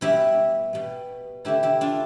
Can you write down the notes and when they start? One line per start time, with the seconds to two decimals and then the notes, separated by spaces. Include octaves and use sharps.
0.01 B2 G3 B3 E4 G4
0.73 B2 G3 B3
1.45 D3 A3 D4 E4 G4
1.63 E4 G4
1.81 D4 F4